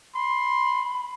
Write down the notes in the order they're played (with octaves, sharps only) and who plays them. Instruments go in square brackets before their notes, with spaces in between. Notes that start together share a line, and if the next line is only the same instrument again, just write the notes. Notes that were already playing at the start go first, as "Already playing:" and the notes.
[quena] B5 [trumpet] C6